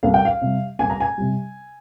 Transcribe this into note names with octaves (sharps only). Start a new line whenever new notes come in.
C2 F5
G5
F5
C3 G3
C2 G#5
A#5
G#5
C3 G3